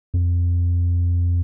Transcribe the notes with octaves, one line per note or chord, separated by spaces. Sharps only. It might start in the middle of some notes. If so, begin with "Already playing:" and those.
F2